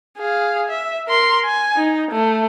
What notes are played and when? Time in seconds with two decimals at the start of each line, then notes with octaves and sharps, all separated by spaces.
0.18 G#4 F5
0.69 E5
1.08 A#4 C6
1.45 G#5
1.76 D#4
2.11 A3